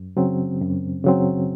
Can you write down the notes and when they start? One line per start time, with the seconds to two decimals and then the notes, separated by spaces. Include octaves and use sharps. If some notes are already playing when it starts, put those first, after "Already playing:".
Already playing: F#2
0.17 C#3 F#3 C4
0.61 F#2
1.04 C#3 F#3 C4